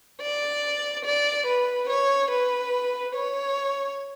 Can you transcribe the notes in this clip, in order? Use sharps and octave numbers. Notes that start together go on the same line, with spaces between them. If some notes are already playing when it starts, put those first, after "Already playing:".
D5
D5
B4
C#5
B4
C#5